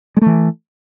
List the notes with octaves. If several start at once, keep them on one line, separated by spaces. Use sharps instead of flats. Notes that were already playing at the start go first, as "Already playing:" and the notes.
E3 G#3 A3